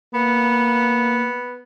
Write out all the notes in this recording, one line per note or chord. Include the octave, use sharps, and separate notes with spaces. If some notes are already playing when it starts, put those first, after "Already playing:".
A#3 B3